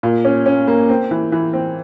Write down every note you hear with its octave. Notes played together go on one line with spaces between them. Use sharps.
A#2
C#4
C#4
A#3
C4
E3
E3
C4